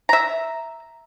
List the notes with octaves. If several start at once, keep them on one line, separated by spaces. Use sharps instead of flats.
E5 A#5